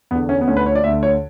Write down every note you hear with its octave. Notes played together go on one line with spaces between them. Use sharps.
E2 D3 B3
C#4
B3
D2 D3 C#4
B4
C#5
D5
D2 E5
D3
C#5